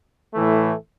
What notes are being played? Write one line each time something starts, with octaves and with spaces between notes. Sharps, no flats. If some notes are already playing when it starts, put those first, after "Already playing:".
A2 E3 A3